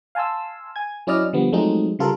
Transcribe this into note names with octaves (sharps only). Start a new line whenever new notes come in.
F5 G#5 A5 C6 E6
G#5 G#6
F#3 C#4 E4 D5 D#5 F6
D3 F3 G3 B3
F3 F#3 G#3 A3 C4 D#4
C#3 G3 F4 A4 A#4